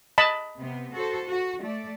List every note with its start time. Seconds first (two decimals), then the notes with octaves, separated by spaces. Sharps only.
0.18 D#5 A5 B5
0.58 C3 B3
0.93 F#4 A4 C5
1.27 F#4
1.62 A3 D5